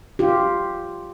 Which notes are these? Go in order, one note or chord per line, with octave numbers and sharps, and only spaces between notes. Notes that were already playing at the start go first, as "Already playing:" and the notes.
F4 G4